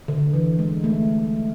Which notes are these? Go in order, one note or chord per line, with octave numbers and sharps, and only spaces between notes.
D3
E3
G#3
A3